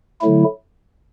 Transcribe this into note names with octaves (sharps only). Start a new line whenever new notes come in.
D3 F#3 A3 E4